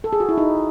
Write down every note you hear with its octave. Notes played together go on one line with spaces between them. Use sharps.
A4
G#4
F#4
E4
D#4